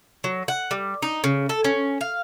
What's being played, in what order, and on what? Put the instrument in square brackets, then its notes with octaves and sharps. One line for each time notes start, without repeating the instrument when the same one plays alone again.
[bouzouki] F#3
F#5
G3
D#4
C#3
A4
C#4
F5